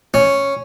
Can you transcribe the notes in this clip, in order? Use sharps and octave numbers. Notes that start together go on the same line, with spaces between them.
C#4